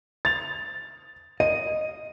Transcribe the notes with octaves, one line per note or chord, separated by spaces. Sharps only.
A6 F7
D#5 D#7